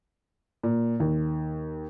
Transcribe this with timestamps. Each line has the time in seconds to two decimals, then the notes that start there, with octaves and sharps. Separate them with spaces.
0.63 A#2
1.00 D#2